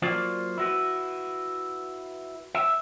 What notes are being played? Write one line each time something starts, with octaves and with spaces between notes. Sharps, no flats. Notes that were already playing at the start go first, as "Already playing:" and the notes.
F#3 A#3 F4 C5 D5
E4 F#4 B4
E5